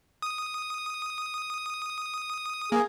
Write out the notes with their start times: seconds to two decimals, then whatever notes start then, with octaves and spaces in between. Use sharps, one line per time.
0.22 D#6
2.72 A#3 G#4